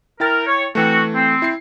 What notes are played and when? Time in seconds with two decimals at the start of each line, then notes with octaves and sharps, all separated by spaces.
0.20 E4 A#4 G5 A6
0.45 C#5
0.75 E3 A3 C4 F#4
1.14 C4
1.42 E4 C7